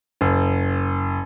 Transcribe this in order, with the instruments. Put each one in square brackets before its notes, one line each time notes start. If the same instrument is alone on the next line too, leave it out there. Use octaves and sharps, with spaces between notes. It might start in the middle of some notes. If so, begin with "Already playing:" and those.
[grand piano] F#1